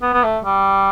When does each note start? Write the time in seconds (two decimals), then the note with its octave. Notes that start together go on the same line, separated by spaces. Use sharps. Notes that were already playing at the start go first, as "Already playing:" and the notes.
0.02 B3
0.13 B3
0.23 A3
0.44 G3